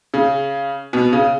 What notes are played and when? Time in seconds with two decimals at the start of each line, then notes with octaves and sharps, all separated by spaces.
0.14 C#3
0.93 B2
1.13 C#3